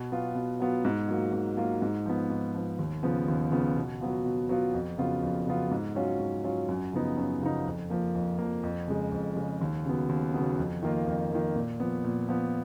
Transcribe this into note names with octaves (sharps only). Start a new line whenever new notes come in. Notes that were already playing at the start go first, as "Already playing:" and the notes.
Already playing: B2
F#3 B3 F4
B2
F#3 B3 F4
G#2
F#3 A#3 F4
G#2
F#3 A#3 F4
G#2
F3 B3
G#2
F3 B3
D#2
C#3 F3 B3
D#2
C#3 F3 B3
B2
F#3 B3 F4
B2
F#3 B3 F4
F2
C#3 F#3 B3 F4
F2
C#3 F#3 B3 F4
G#2
F#3 C#4 F4
G#2
F#3 C#4 F4
F#2
C#3 F3 B3 D#4
F#2
C#3 F3 B3 D#4
F2
F3 A#3
F2
F3 A#3
F2
C#3 G#3
F2
C#3 G#3
D#2
C#3 F#3 B3
D#2
C#3 F#3 B3
F2
D#3 A#3 F4
F2
D#3 A#3 F4
A#2
F3 B3
A#2
F3 B3